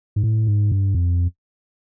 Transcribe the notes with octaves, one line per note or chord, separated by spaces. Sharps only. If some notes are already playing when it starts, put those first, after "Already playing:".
G#2
A2
G#2
G2
F2